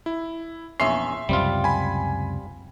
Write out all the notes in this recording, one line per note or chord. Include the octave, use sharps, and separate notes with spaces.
E4
A#1 E2 C#4 E5 C6 C7
C#2 F#2 C3 G3 C4 F4
G#5 B5